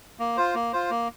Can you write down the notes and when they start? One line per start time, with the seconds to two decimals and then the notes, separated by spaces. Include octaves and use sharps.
0.19 A#3
0.37 F4 C5
0.54 A#3
0.73 F4 C5
0.90 A#3